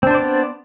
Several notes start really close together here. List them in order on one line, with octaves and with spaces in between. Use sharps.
C4 D4 C5 D5 B3